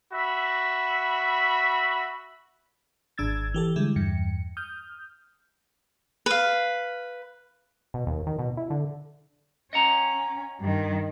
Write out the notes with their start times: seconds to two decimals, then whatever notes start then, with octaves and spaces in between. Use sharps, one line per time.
0.13 F#4 E5 B5
3.18 G#1 D4 E6 G#6 A6
3.54 E3 G4 A4
3.76 D3 G3 G#3 E4
3.96 E2 G2 C#7
4.57 D#6 F6 G6
6.26 B4 F5
7.94 B2
8.07 D#2
8.27 D#3
8.39 B2
8.57 E4
8.70 D3
9.73 C#4 D#5 F#5 A#5
10.61 G2 D#3